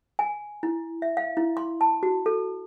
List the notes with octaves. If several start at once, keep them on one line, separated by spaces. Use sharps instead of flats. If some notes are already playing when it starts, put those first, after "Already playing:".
G#5
E4
E5
F5
E4
C6
A5
F#4
A4